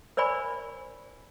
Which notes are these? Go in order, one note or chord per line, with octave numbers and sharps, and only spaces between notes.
A#4 C5 D5 G#5 B5 C#6